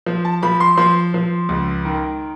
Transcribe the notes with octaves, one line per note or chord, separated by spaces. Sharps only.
F3
A5
F3 B5
C6
F3 C6
F3
C#2
D#3